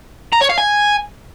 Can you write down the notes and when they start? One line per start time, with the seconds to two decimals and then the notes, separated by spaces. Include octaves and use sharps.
0.32 A#5
0.41 C#5
0.49 F5
0.58 G#5